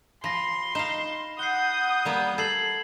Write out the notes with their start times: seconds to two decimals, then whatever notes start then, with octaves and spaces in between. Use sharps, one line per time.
0.24 F3 B5 C6 A#6
0.75 D#4 F5 E7
1.39 F#5 D#6 G6 C7 G7
2.05 G3 A#3 B3
2.38 A4 G#6 C7 F#7